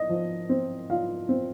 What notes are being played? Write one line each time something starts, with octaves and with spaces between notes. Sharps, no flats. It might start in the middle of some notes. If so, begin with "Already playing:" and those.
Already playing: D#5
F3
C4
F4 F5
C4